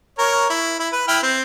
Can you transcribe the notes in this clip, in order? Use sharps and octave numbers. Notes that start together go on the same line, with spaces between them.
A#4 C#5
E4
E4
B4
E4 G5 F6
C4